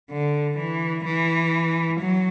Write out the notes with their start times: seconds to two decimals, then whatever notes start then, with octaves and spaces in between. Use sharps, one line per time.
0.11 D3
0.57 E3
1.05 E3
2.00 F#3